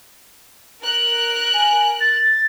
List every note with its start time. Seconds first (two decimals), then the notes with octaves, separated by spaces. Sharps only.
0.83 A#4 F#6
1.54 G#5
2.00 A6